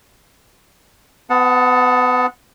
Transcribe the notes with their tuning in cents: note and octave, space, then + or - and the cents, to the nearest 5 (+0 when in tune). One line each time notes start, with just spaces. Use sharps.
B3 +30 F#5 -15 A5 +0